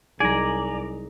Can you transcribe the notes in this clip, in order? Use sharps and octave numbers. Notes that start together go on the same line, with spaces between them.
C2 F#3 D#4 G#4 D5 G#5 A#5